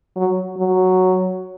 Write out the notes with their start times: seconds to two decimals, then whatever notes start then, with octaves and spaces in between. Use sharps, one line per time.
0.16 F#3
0.57 F#3